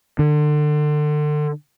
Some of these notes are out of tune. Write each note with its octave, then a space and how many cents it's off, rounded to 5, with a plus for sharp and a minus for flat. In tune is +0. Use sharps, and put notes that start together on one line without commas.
D3 +30